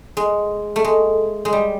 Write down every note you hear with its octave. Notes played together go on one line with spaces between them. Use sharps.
G#3
A3
G#3
G#3
G3